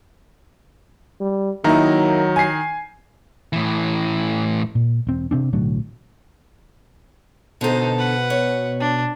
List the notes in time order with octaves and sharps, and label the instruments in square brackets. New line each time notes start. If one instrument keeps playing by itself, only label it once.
[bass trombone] G3
[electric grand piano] D#3 A#5 [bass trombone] F#3 [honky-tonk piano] A#3 D#4 E4
[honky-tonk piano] G#5 C7
[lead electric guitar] A2 E3
[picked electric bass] A#2
E1 C4
C3 C4 D4
B1 A2 D3 F#3
[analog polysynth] B2 [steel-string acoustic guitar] D3 A4 [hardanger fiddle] D#4 C5
[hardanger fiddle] B4 F#5
[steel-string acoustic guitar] C#5
[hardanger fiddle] D4